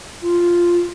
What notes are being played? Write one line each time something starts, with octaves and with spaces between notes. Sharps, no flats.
F4